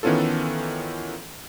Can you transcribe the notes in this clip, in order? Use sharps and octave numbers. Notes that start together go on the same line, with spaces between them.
D#3 E3 B3 C#4 F4 A4